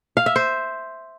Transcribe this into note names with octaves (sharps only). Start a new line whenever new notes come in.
F5
E5
C5